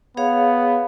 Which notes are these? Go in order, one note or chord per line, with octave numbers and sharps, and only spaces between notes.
B3 G#4 C#5 F5